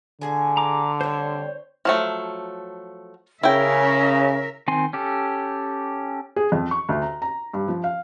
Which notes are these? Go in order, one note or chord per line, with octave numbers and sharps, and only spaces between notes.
A2 D3 G#4 G#5
A#5 D6
G3 C4 C5 C#5
F3 F#3 A3
C#3 C#4 E4 A#4 E5 G5
D#3 C4 G#5 C6
C#4 G4 A4
G#4
F2
C#6
D2
A#5
A#5
G2
F3
F5